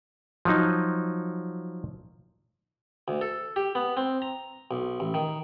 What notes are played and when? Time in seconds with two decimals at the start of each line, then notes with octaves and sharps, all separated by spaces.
0.45 F3 F#3 D#4
3.08 D2
3.21 A4
3.56 G4
3.75 B3
3.97 C4
4.22 A#5
4.71 B1
5.00 A1
5.14 D#3